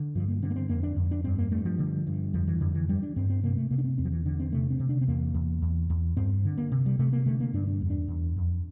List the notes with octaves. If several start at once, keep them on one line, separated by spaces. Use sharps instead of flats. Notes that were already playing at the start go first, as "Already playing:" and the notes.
Already playing: D3
G2 F3
A#3
D3 C4
A#3
C4
F2 A#3
D4
F2
D4
G2 C4
A#3
G2 A3
F3
D3
G2
F2 F3
E3
F2 D3
E3
G2 G3
D4
G2 C4
C4
C3 A#3
A3
C3 A#3
D4
C4
E2 C4
F3
E3
D3 D4
C4
C3 A3
C4
C3
D4
C4
E2 A#3
E2
E2
E2
G2 C4
D3
A#3
C3
G3
C3 A3
A#3
D3 A3
A#3
G2 D4
D4
E2
D4
E2
F2